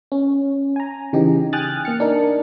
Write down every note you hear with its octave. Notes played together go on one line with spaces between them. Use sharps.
C#4
G#5 A#5
C#3 E3 D#4 G4
G5 G#5 D#6 F6 F#6 A6
A#3 F6 C#7
D4 D#4 A#4